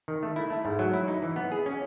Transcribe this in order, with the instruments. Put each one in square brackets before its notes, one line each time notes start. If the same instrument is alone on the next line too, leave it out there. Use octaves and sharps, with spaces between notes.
[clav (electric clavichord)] D#3
A3
E4
A3
G#2
F#3
E4
D#4
E3
B3
G#4
C#4